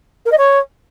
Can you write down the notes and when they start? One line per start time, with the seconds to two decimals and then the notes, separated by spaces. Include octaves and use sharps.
0.25 A#4
0.32 D#5
0.38 C#5